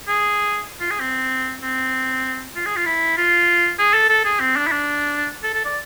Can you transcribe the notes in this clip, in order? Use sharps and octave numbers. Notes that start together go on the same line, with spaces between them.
G#4
F4
G#4
C4
C4
F4
G#4
F4
E4
F4
G#4
A4
A4
G#4
C4
D4
E4
D4
A4
A4
D5